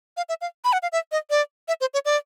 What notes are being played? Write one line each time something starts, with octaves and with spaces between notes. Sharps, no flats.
F5
E5
F5
B5
F#5
F5
E5
D#5
D5
E5
C5
C#5
D5